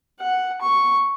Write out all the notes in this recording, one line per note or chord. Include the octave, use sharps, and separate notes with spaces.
F#5
C#6